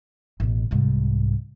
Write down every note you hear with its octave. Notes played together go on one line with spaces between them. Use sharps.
A1 B2
C2 G#2